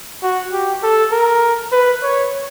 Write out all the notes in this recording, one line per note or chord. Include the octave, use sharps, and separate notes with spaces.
F#4
G4
A4
A#4
B4
C#5